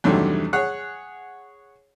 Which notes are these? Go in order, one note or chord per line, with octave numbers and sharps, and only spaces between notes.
E2 G2 C3 D#3 F#3 A3
G#4 C#5 F#5 F#6